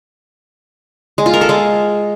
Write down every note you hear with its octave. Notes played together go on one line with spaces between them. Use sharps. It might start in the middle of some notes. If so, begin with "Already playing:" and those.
G#3
F4
A#4
A4
G#3